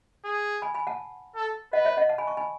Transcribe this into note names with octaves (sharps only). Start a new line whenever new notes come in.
G#4
G#5 B5
G#5 B5
F#5 A5
A4
B4 D#5 F#5
C#5 E5
D#5 F#5
F#5 A5
G#5 B5
A5 C#6
G#5 B5